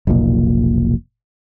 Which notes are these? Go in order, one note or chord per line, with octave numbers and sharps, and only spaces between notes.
F1 B1 A#2 A#3